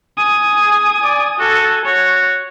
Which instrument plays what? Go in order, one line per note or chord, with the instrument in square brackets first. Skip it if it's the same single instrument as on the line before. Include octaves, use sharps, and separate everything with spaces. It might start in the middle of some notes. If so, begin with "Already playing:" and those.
[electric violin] G#5 D#6
[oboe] G#4
D5
[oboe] F#4 [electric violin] A4 G#5
[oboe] F#4 [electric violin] C#5